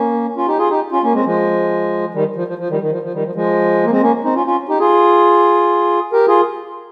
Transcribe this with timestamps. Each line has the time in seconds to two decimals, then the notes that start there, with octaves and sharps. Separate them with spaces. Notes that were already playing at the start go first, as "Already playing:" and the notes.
Already playing: A#3 C#4
0.36 C#4 F4
0.48 D#4 G4
0.58 F4 G#4
0.70 D#4 G4
0.92 C#4 F4
1.03 A#3 C#4
1.14 G#3 C4
1.25 F3 G#3
2.14 D#3 G3
2.36 F3
2.48 F3
2.58 F3
2.70 D#3 G3
2.81 D#3
2.91 F3
3.03 F3
3.13 D#3 G3
3.25 F3
3.35 F3 G#3
3.85 A#3
3.91 G#3 C4
4.02 A#3 C#4
4.24 C4 D#4
4.35 C#4 F4
4.46 C#4 F4
4.69 D#4 G4
4.79 F4 G#4
6.13 G4 A#4
6.27 F4 G#4